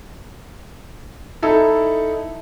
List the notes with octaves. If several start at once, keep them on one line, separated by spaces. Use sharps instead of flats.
D#4 E4 A4